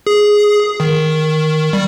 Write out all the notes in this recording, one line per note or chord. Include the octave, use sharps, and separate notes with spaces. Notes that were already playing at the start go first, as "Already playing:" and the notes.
G#4
D#3
G3